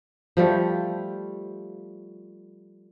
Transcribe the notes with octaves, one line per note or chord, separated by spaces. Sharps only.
F3 G3 A3